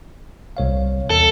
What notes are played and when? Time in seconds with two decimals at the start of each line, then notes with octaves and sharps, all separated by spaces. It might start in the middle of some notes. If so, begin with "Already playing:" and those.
0.57 C2 C#5 F5
1.10 E2 A4